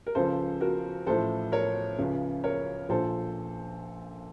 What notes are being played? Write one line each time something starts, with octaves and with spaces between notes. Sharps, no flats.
A#4
C#2 C#3 F3 A4 C5
F#4 A#4
A1 A2 F3 A4 C5
A#4 C#5
C#2 C#3 F3
A#4 C#5
A#1 A#2 F3 A4 C5